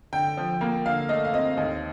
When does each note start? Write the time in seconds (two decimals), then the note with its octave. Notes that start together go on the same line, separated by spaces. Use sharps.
0.13 D3 G5
0.37 F3
0.61 A#3
0.86 D3 F5
1.09 A3 D#5
1.25 F5
1.33 C4 D#5
1.57 D#2 D#5